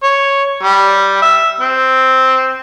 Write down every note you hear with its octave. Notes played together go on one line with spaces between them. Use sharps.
C#5
G3
E5
C4